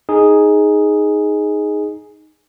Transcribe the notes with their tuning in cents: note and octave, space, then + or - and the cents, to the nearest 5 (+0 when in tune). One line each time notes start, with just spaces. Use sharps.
D#4 +0 G#4 +0